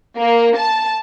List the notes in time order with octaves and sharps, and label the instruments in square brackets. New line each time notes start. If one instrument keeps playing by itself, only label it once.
[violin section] A#3
A5